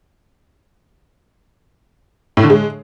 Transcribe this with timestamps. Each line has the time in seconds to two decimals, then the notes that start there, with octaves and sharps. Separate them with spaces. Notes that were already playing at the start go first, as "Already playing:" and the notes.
2.37 A2
2.43 D3
2.50 G#3